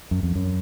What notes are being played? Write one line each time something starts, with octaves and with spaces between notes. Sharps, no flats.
F#2
F2
F#2